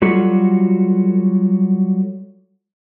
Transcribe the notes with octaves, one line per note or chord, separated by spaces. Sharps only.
F#3 G3 F4 F#4 A4